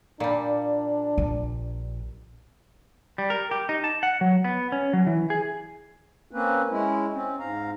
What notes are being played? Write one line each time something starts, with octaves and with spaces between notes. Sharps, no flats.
A#2 G3 D4
A#1
G3
A#4
G4
D#4
A5
F#5
F#3
B3
C#4
F#3
E3
G#4
A#3 C4 C#4 B4
G#3 C#4 E4
C4 C#4
G#2 F5 A#5